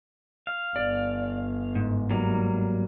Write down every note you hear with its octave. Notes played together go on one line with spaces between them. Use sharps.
F5
G1 D5
G#2
F#3 G3 A#3